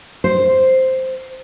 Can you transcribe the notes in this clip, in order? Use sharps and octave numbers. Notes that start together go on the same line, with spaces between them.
C5